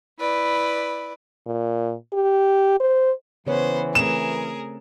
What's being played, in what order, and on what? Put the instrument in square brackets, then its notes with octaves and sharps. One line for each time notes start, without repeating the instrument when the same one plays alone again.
[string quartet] E4 B4 D5
[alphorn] A#2
G4
C5
[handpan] C#3 C#5 [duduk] E3 [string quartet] B3 C5
[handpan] A3 C4 [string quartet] G#4 A#4 [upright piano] E7